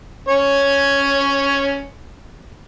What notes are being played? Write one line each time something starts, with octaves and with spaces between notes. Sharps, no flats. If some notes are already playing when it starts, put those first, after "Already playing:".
C#4 C#5